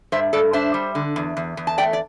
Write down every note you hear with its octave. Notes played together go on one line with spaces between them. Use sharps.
G2 C5 E5
G2 A4 D5
D4 C5 E5
G3
D3
E2
E2
E2
A5
A3 D5 G5
D5